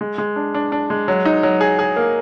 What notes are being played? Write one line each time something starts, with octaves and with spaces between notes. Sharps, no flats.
G#3
G#3
D4
D4
D4
G#3
F#3
D#4
F#3
G#4
G#4
A#3